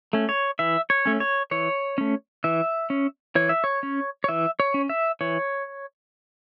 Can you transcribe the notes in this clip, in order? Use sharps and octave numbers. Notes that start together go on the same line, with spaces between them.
A3 C#4
C#5
E3 E5
C#5
A3 C#4
C#5
E3 C#5
A3 C#4
E3 E5
C#4
E3 C#5
E5
C#5
C#4
C#5
E3 E5
C#5
C#4
E5
E3 C#5